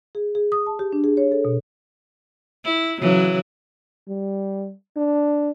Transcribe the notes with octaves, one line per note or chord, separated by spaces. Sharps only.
G#4
G#4
D#6
A5
G4
D4
G#4
C#5
A4
B2
E4
C#3 E3 F#3
G3
D4